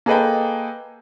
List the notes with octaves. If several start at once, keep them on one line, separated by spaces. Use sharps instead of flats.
A#3 G#4 A4 B4 D#5 G5